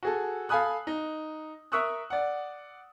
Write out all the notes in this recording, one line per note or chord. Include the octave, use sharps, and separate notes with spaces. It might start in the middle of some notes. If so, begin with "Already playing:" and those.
F#4 G#4 A4
A4 F5 G#5 B5 D#6 F#6
D#4
A#4 E5 C#6 D#6 E6 F#6
D5 F#5